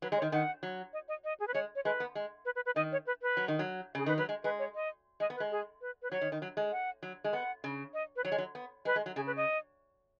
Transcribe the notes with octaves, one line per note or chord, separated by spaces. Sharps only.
F#3 B4
G#3
C#5
D#3
D#3 F#5
F#3
D#5
D#5
D#5
G#4
B4
G#3 C#5
C#5
G#3 B4
B3
G#3
B4
B4
B4
D#3 D#5
C#5
B4
B4
F#3
D#3
F#3
C#3 G#4
D#3 B4
F#3 B4
G#3
G#3 B4
C#5
D#5
G#3 D#5
B3
B4
G#3
G#4
B4
B4
F#3 C#5
D#3
D#3
F#3
G#3
F#5
F#3
G#3
B3 F#5
C#3
D#5
B4
F#3 C#5
G#3
F#3
B3
G#3 B4
G#3
F#3
C#3 G#4
B4
D#5